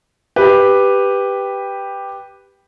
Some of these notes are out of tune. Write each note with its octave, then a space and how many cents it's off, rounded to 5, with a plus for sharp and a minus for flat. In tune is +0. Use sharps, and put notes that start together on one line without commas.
G4 +5 B4 +0